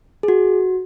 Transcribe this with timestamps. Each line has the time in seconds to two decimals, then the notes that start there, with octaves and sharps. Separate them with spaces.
0.23 G#4
0.28 F#4